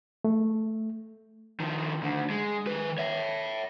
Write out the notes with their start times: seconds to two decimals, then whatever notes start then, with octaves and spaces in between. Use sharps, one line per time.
0.24 A3
1.60 D#3 F3
2.03 D2 D3
2.30 G#3
2.67 D#3 B4
2.98 C#5 E5